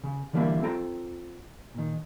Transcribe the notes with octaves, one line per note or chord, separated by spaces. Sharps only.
C#3
D3 E3 G3 A#3 D4 E4
C4 F4 A4 G5 A#5
A#2 D#3